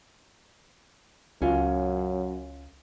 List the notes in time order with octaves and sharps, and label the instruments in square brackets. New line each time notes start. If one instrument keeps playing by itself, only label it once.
[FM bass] C#2 [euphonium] F#2 [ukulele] C#4 F4